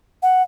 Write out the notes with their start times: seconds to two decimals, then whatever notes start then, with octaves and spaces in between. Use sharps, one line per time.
0.23 F#5